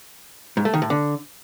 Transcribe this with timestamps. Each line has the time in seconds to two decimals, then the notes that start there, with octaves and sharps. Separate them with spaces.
0.57 G#2
0.65 A3
0.74 D#3
0.82 A2
0.90 D3